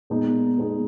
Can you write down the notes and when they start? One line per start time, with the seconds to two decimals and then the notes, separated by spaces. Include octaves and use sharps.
0.10 A#2 G#3 B3 D#4 G#4
0.58 A#2 G#3 B3 D#4 G#4